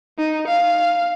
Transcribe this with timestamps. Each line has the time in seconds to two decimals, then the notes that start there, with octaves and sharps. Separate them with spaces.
0.18 D#4
0.48 F5